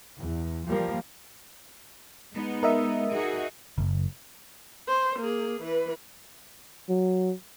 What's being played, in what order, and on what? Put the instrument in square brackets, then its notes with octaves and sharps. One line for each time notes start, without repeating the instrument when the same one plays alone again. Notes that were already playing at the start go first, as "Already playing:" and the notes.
[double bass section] E2
F3 G3 A#3
[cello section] G#3 B3 D#4
[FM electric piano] A#4 D#5 E5
[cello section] D#4 F#4 G#4
[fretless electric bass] F#1
[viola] C5
A#3 G#4
E3 B4
[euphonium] F#3